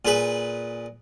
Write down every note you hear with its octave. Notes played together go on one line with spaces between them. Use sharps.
A#2 G#4 B4